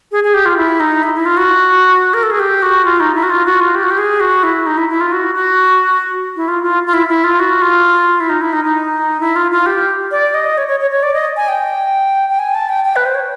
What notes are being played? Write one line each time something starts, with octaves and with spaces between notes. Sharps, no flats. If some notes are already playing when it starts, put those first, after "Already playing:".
G#4
G#4
G4
F4
E4
D#4
E4
E4
F4
F#4
A#4
A4
G#4
G4
F#4
F4
D#4
E4
F#4
F4
F#4
F4
G4
F#4
G4
G#4
F#4
E4
D#4
E4
E4
F4
F#4
F#4
E4
F4
F4
F4
E4
E4
F4
F#4
F4
E4
D#4
E4
D#4
D#4
E4
F4
F4
G4
D5
D#5
C#5
C#5
C#5
C#5
D5
D#5
G#5
G5
G5
G#5
A5
G5
G5
B4
C5
C#5